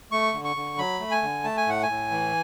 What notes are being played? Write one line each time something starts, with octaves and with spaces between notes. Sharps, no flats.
A3 C#6
D3
C#6
D3
F#3 B5
A3
G#5
D3
A3 A5
G#5
A2 F#5
G#5
A2
E3